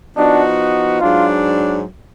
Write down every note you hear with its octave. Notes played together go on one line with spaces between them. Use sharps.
F3 B3 D4 D#4 F#4
G#2 F#3 D4 F4